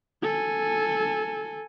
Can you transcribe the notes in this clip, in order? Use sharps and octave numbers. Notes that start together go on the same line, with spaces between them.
A4 G#5